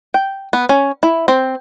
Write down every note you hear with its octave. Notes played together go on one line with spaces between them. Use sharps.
G5
B3
C#4
E4
C4